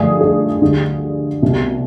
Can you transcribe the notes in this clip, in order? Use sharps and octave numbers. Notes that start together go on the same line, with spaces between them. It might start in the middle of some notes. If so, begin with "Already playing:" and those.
Already playing: G2 D3 F3 A3 G#4
G#4
D2 D3 G3
C2 B2 G3